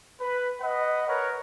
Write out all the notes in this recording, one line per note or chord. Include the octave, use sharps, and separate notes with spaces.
B4
B4 D#5 F#5
A#4 B4 C#5 F#5